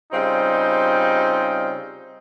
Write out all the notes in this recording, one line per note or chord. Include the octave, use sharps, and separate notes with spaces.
C#3 G3 C4 D#4 F4